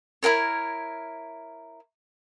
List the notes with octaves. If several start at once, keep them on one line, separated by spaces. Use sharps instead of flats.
E4 G4 A#4 C#5